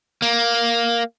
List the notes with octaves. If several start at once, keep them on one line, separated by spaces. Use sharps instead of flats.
A#3